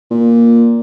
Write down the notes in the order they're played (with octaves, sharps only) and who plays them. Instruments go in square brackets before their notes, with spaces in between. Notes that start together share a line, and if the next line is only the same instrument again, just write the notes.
[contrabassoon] A#2